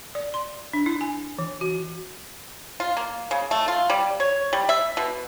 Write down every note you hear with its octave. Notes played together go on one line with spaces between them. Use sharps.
D5
C6
D4
E4
G#5
E3
F#4
F4
A#3
C#3
A3
F4
G3
C#5
G3
E5
B2